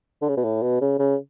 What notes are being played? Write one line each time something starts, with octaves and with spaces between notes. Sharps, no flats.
D3
C#3
B2
A2
B2
C#3
C#3